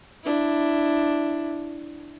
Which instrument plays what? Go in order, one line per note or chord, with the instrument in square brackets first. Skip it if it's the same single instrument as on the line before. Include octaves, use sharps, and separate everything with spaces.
[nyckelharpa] D4 E4